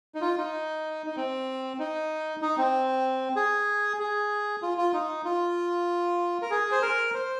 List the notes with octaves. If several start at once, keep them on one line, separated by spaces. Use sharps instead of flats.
D#4
F4
D#4
D#4
C4
D#4
D#4
C4
G#4
G#4
F4
F4
D#4
F4
A#4
G#4
C5
A#4
C5